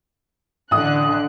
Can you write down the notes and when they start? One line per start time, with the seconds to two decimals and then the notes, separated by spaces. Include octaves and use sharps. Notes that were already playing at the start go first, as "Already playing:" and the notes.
0.71 A1 D3 D#6 F#6